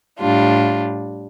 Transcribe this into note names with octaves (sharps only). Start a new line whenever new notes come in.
A2 G3 D4 F4